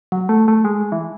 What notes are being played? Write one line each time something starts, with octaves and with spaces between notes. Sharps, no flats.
F#3
A3
A3
G#3
E3